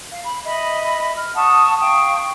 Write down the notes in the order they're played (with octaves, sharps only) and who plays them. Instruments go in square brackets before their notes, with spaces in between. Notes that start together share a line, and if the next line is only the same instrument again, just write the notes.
[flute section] F5
B5
D#5 E5 B5
F6
F#5 A5 C#6 D#6
F5 G5 C#6 D#6